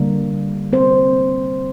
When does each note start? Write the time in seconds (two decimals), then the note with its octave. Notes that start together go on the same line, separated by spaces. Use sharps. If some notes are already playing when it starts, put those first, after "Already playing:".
Already playing: D3 G3 A#3
0.73 C4 C5